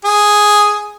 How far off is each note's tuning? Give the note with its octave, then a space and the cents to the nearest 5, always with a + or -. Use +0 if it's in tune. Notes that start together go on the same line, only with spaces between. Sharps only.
G#4 +0